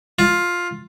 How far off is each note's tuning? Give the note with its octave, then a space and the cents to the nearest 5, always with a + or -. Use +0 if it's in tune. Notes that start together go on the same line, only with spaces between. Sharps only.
F4 +10